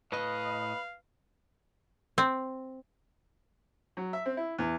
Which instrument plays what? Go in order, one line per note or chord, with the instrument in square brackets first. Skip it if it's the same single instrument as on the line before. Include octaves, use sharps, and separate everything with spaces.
[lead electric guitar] A2 D#5 [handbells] B4 F#6 [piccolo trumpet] F5 [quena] B5
[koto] C4
[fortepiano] F#3
E5
C4
E4
E2